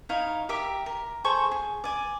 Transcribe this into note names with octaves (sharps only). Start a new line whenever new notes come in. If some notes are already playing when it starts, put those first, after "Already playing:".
D#4 E4 C#5 F5
G4 A#4 E5 D6
A#4
G#4 A4 C5 C#6
G#4
D5 G#5